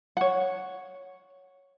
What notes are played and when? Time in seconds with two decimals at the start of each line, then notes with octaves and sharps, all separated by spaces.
0.17 C#5 F#5